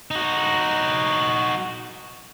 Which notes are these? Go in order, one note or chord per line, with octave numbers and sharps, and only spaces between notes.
D#4 F#4